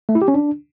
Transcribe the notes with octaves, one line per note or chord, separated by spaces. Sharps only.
A3
E4
G4
C#4
D4